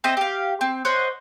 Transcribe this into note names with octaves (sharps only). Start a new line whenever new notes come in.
C4 D#5 E5 D#6
G4 F5
C4
C5 C#5 D#5 F#5